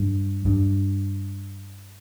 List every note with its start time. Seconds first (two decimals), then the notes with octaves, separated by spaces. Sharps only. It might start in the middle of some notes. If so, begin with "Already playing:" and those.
Already playing: G2
0.45 G2